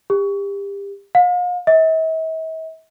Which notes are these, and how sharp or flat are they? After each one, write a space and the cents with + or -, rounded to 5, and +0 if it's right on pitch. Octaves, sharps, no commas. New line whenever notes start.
G4 +30
F5 +40
E5 -45